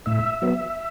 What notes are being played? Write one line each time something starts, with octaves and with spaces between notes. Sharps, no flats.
A2 E5
F#3 B3